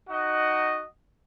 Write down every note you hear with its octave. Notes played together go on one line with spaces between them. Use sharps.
D#4 F#4 D#5 F#5